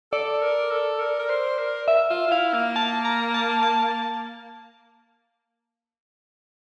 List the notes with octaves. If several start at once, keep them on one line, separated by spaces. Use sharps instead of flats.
A4 D5
A#4
A4
A#4
A#4
C5
A#4
E5
F4
F4
E4 F5
A#3
A5
A#5
A5
A5